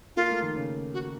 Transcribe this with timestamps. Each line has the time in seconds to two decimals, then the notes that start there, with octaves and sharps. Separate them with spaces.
0.16 A#3 F4
0.30 A3
0.42 D#3
0.55 C#3
0.94 F#4